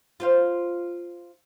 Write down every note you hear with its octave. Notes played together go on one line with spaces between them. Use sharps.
F4 C5 F5